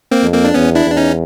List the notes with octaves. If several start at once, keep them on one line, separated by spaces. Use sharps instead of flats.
A#3 C4
F2
A#3 C4
D4
E2 B3 C#4
D4 E4
E2 D4
C#4 D#4